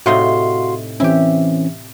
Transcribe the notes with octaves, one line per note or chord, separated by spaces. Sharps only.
A2 C3 D#4 F#4 F5 C6
E3 C4 C#4 E4 G4